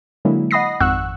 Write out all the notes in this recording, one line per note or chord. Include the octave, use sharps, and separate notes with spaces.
D3 F#3 G#3 A#3 E4
D#5 F#5 B5 D#6 A#6 C7
G#1 F2 F#5 C#6 E6 F#6